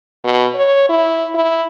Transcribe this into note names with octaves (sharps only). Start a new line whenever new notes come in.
B2
C#5
E4
E4